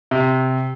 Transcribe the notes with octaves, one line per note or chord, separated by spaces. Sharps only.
C3